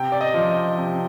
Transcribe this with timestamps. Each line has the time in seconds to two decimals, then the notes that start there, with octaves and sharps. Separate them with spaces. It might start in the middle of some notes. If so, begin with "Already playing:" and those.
Already playing: C3 G5
0.12 D5
0.21 D#5
0.34 F3
0.49 D#5
0.78 C3